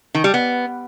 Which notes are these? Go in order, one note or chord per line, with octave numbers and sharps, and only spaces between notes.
D#3
G3
B3